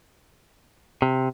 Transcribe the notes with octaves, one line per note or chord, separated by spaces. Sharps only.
C3